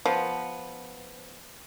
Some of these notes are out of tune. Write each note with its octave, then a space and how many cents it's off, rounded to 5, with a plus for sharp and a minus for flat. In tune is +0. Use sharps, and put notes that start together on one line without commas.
F3 +0 B3 +0